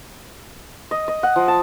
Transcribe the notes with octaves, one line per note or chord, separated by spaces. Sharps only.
D#5
D#5
F#5
F3
A5